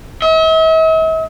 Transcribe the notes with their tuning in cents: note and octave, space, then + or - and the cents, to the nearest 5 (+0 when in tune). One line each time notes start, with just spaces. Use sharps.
E5 -45